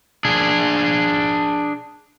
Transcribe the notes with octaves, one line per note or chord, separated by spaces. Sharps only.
D4 G#4